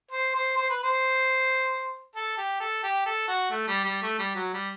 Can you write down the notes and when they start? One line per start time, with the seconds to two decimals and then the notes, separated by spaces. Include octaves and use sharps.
0.11 C5
0.34 C5
0.57 C5
0.70 B4
0.84 C5
2.16 A4
2.38 G4
2.60 A4
2.83 G4
3.06 A4
3.28 F#4
3.51 A3
3.68 G3
3.85 G3
4.02 A3
4.19 G3
4.35 F#3
4.53 G3